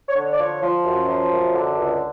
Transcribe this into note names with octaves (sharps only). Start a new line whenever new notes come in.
C#5
D3
C#5
D5
F3 C#5
F3
F#2
F3
F#2
D3
C#2